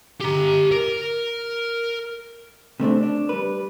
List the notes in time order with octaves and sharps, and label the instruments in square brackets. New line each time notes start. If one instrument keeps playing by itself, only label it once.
[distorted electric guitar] G4 A#5
A#4
[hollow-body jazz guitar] C3 A3 C4 D4
D4
G3 B4